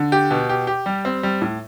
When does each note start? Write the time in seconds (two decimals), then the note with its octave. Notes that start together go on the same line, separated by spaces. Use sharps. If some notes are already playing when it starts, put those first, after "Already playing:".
Already playing: D3
0.12 G4
0.31 B2
0.49 G4
0.67 G4
0.86 G3
1.05 C4
1.23 G3
1.42 A2